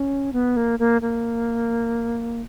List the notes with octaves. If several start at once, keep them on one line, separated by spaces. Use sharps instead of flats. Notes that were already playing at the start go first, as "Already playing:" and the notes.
Already playing: C#4
B3
A#3
A#3
A#3